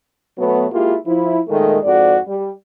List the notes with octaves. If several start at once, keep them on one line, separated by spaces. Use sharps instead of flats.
B2 F#3 A3 B3
G#3 A#3 E4 F4 G4
F3 E4
A#2 D#3 G#3 A3
F2 G#2 F#4 D5
G3